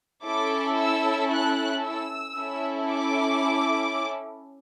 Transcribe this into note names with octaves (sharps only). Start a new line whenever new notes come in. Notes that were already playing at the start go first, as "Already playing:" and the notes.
C#4 E4 A4 D6
E6
F#6
E6
C#4 E4 A4
D6